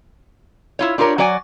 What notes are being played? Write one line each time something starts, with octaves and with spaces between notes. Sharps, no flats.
E4 F4 C#5
D4 F4 G4 A#4 C#5
F#3 F#4 D5 G#5